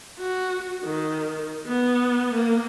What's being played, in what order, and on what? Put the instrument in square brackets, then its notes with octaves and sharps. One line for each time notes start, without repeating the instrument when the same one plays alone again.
[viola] F#4
D#3
B3
A#3